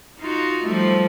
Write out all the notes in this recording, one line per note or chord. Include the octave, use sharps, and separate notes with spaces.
D#4 F4 F#4
F3 G3 A3